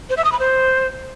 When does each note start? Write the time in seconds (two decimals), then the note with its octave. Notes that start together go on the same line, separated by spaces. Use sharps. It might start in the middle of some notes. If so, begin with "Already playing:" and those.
0.10 C5
0.17 E5
0.25 D#6
0.32 B5
0.40 C5